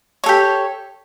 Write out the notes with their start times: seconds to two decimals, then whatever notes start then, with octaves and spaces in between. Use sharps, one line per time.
0.24 C#5
0.26 A4
0.29 G4